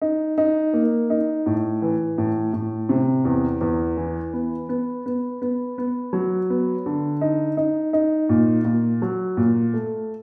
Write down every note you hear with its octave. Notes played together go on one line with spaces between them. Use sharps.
D#4
D#4
A#3
D#4
A2
E3
A2
A2
C3
E2
E2
E3
B3
B3
B3
B3
B3
F#3
B3
D3
D#4
D#4
D#4
A#2
A#2
F#3
A#2
A3